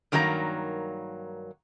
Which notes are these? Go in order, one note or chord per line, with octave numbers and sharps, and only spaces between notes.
G2 D#3 F#3 A#3 G4 A#5